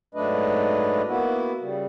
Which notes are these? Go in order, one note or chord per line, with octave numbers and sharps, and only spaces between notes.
G#2 F#3 A3 D4 B4 D#5
A#3 B3 E4 F#4
C#3 G3